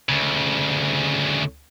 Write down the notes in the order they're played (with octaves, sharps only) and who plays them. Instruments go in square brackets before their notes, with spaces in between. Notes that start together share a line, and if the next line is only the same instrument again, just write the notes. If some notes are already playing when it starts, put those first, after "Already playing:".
[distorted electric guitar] D2 C#3